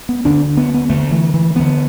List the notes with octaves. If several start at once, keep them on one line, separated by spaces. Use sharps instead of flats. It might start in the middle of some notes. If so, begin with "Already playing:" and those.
B3
D2 D3 D4
B3
B3
D2 D3 A3
E3
E3
D2 D3 B3